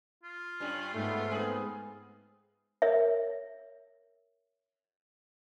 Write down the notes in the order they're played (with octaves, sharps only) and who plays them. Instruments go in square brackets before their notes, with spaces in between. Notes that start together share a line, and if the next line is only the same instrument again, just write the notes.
[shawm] F4
[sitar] G2 G3 C#4
[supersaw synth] G#2 B3 [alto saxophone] A3
[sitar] C4 G#4
[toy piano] A#4 C#5 E5